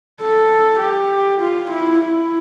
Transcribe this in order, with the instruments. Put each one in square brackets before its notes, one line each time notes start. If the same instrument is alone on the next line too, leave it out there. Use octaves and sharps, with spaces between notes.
[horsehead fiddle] A4
G4
F4
E4
E4